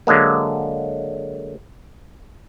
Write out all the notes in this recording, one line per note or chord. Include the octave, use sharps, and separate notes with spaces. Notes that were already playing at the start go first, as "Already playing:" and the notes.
D3 F#3 G#3 A#3